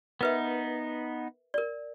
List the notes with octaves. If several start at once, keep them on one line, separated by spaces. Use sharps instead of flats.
B3 D#4 A#4 B4 E5
A#4 D5